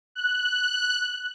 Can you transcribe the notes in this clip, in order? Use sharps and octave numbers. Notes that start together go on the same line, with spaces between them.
F#6